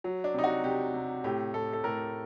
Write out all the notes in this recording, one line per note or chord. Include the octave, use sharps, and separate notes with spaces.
F#3
D4
C3 D#4
F#4
C3 G4
C3
A2 G4
A2 A4
A4
A2 A#4